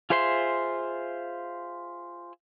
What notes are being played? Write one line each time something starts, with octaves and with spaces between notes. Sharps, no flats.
F4 G#4 C5 E5 C6